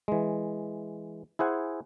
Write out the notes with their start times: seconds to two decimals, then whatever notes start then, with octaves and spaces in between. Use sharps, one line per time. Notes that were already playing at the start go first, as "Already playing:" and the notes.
0.08 E3 G#3
1.39 E4 G#4 C5 F#5 G#5